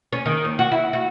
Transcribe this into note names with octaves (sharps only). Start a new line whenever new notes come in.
C#4
D#3
D#2
F#4
E4
F#4